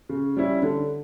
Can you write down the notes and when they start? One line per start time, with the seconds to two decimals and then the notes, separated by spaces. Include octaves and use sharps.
0.09 C#3
0.37 G3 C#4 E4
0.62 D3